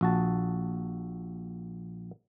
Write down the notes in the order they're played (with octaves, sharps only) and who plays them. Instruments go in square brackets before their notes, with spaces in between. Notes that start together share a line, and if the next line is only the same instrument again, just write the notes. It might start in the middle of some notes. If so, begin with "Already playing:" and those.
[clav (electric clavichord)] A#1 F#4 A5